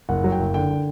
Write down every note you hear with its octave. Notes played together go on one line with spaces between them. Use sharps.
F#1 F#5
F#3
G5
F#1
D3 G5
D3